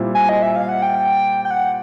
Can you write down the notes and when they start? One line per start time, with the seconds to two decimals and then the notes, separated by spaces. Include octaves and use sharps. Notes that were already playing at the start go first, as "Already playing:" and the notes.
Already playing: A#2 G3 C4 E4
0.15 G#5
0.29 D#5
0.42 E5
0.56 F5
0.69 F#5
0.82 G5
1.45 G5
1.51 F#5